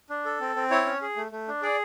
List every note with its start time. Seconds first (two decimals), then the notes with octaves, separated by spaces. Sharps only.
0.10 D4
0.25 A4
0.41 C4
0.56 C4
0.70 E4 C#5
0.86 C#4
1.02 G#4
1.16 A3
1.32 A3
1.48 D4
1.62 G#4 D5